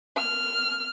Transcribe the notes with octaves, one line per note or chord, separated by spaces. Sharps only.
F6